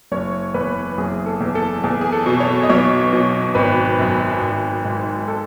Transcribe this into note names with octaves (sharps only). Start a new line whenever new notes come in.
F#1 C#5
E2 B4
F#1 G#4
A4
E2
A4
E2 G#4
G#4
A4
B2
C#5
D#5
B1 C#5
B2
G#1 B4
F#2
G#1
G#2
A4